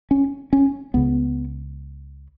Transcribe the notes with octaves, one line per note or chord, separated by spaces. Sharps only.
C#4
C#4
C#2 C#3 B3